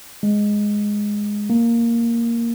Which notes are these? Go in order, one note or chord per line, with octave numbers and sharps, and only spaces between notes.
G#3
A#3